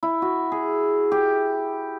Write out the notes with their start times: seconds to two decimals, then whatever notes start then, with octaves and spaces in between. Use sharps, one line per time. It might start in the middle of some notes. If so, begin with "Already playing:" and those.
0.03 E4
0.22 F#4
0.52 G#4
1.12 G4